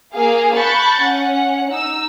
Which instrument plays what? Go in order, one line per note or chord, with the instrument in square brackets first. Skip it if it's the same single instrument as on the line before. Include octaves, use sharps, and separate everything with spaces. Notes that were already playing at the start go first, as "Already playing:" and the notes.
[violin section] A#3 G#4 F5
A5 B5 C#6 F#6 G6 A6
C#4 F#5
D#4 E6